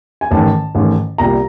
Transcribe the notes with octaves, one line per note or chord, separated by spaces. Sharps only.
G#5
A1 G#2 D#3 A5
A1 G#2 D#3
C2 A#2 G3 A#5